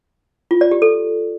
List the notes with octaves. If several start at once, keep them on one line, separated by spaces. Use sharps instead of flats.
F4
D5
G4
A4